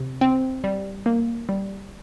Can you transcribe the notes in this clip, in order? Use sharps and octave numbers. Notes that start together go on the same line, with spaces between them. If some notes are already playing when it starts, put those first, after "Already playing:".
Already playing: C3
C4
G3
A#3
G3